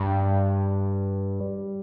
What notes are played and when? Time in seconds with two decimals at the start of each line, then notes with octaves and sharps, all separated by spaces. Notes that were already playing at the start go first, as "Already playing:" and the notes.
Already playing: G2
1.40 G3